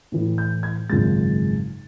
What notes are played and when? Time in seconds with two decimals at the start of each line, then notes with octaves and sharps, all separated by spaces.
0.12 A2 E3 A3
0.38 G6
0.63 G#6
0.90 G#1 F#2 C#3 F3 G#3 A6